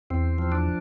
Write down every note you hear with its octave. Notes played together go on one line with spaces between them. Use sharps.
E2 C4
F3
D4